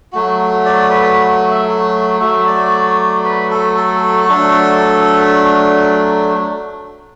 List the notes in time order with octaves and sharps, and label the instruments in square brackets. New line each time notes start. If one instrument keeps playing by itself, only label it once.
[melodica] F#3 A3 F#4
D5
B4
E5
F#4
F#3 A3 F#4 E5
D5
B4
A4
A4
F#3 A3 D4